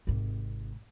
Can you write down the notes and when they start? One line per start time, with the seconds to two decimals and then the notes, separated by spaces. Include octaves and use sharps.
0.07 G#1 C3